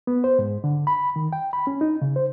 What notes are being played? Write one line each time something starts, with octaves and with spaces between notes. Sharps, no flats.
B3
C5
G#2
D3
B5
D#3
G5
B5
C#4
D#4
C#3
C5